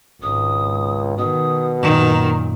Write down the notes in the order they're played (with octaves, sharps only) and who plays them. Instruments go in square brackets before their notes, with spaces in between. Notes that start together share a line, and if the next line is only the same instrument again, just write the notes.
[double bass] G#1 [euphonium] C#2 [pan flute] D#6
[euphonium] B2 [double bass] D#3 [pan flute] D#6
[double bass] F#2 A#2 [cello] D#3 [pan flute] A#5